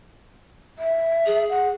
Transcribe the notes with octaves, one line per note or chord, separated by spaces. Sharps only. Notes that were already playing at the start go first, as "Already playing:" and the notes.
E5
G#4
F#5